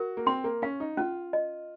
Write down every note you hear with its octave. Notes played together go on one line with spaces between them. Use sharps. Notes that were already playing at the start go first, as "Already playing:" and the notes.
Already playing: F#4 A#4
A#3
C4 C6
A#3
C#4 F5
D#4
C#4 F4
D#5